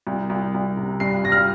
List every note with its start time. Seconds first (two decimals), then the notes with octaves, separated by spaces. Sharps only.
0.07 C2
0.30 C2
0.54 C2
0.77 C3
1.00 G2 C7
1.24 G2 A#6
1.32 F6